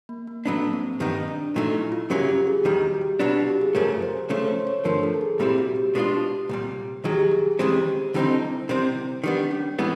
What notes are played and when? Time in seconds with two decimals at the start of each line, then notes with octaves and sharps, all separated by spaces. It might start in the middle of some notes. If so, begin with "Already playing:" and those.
0.09 A#3
0.27 A#3
0.46 A2 F#3 A#3 B3 D4
0.73 C4
1.00 G2 D#3 G3 B3 D#4
1.28 D4
1.55 A#2 F#3 A3 D#4
1.74 E4
1.92 F4
2.10 F#2 C#3 F#3 A#3 C#4 G4
2.29 G4
2.47 G#4
2.65 D#2 D#3 G3 G4
2.83 F#4
3.01 G4
3.19 C2 B2 F#3 B3 D4 F4
3.34 F#4
3.48 G4
3.61 G#4
3.75 F#2 C#3 F3 A3 C#4 A#4
4.02 C5
4.29 C#3 F3 A3 C#5
4.48 C5
4.67 C#5
4.84 G2 D3 F3 A3 A#4
5.03 A4
5.21 G#4
5.39 C2 A#2 G3 C4 E4 G4
5.58 F#4
5.76 G4
5.95 B2 G#3 B3 D4 F4
6.49 C2 A#2 G3
7.04 D#2 D#3 F#3 G#4
7.12 G4
7.20 G#4
7.31 G#4
7.59 D#2 C#3 E3 G#3 C4 G4
8.14 D2 D3 G3 C4 D#4 E4
8.69 C3 D#3 G3 C4
9.24 D#3 G3 B3 D4
9.51 C#4
9.78 A2 E3 G#3 B3 C4